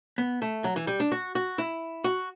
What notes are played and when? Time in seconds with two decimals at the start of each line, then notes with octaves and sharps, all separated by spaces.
0.18 B3
0.42 A3
0.64 F#3
0.76 E3
0.87 G3
1.00 D4
1.12 F#4
1.35 F#4
1.58 E4
2.04 F#4